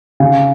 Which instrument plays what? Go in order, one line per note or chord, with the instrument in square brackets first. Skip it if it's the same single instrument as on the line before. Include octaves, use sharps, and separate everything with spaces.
[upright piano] C#3